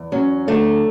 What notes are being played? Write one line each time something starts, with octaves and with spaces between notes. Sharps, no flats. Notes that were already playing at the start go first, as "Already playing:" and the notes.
Already playing: E2
F#3 C#4
D3 A3